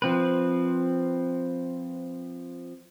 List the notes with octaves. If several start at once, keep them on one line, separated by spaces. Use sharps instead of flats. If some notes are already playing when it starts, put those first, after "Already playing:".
F3 C4 B4